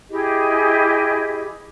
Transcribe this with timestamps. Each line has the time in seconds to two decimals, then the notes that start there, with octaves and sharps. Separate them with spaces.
0.10 E4 G4 G#4 D#5